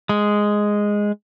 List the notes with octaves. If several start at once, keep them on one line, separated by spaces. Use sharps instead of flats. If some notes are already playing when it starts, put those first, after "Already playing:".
G#3